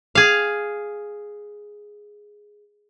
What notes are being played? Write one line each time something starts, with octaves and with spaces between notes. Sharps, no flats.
G#4 F5